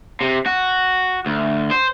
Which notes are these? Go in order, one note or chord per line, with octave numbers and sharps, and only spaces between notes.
C3
F#4
D2
C5